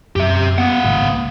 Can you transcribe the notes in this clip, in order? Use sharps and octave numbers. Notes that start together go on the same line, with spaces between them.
F#2 G4 E5
A#3 B3 F#5
G#1 C#2 A2